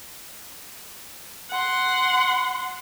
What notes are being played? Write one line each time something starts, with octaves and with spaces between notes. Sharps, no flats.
F#5 C6